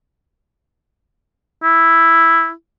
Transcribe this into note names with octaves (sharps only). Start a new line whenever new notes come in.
E4